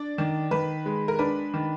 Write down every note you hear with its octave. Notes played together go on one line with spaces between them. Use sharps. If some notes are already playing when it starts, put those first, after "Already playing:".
Already playing: D4 D5
D#3
D#3 B4
G#3
A#4
D4 B4
D#3